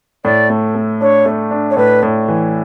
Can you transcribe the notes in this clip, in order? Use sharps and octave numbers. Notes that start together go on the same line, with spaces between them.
A2 D5
A3
A3
D4 C#5
A3
D4
C#5
A2 B4
A2
E3